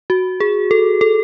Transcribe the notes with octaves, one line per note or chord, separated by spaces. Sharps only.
F#4
G#4
A4
A4